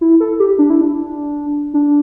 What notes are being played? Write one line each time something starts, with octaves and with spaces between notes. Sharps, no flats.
E4
A4
G4
D4
E4
D4
D4